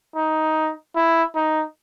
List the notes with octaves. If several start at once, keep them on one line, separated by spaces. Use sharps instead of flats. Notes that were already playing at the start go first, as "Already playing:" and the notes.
D#4
E4
D#4